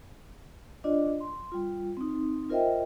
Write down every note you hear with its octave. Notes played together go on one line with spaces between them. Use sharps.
D4 F4 D5 D#5
C6
G3 F4
C4 D#4
F4 A#4 C5 D#5 E5 G5